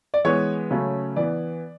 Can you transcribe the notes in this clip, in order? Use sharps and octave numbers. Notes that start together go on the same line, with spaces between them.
D5
E3 G#3 B3 C#5
C#3 F#3 A3 C#4
E3 B3 D5